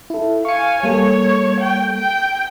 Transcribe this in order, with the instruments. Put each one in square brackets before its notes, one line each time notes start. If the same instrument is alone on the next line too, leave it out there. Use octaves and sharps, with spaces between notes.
[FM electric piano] E4 A4
[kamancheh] F5 G#5 [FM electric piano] C#6 C#7
[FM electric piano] G3 A#3 A4 [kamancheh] C#5
[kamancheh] G5
G5